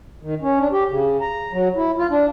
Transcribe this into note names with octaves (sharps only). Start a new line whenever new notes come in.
D#3
C#4
D4
G4
C#3
A#5
F#3
E4
F4
D4